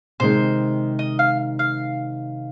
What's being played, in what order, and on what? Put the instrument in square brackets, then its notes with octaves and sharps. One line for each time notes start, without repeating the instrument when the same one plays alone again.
[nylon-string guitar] C3 D#3 G#3 D#4 [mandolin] C5
[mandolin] D#5
F5
F5